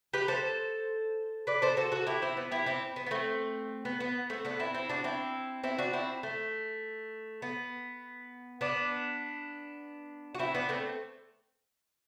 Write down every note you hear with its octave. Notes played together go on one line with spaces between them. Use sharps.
G4 B4
A4 C5
B4 D5
A4 C5
F#4 A4
F#4 A4
E4 G4
C4 E4
B3
E4 G4
C4 E4
B3
B3
A3 C4
B3
B3
A3 C4
B3 D4
C4 E4
C4 E4
D4 F#4
C4 E4
C4 E4
D4 F#4
C4 E4
A3
B3
B3 D4
F#4
C4 E4
B3 D4
A3 C4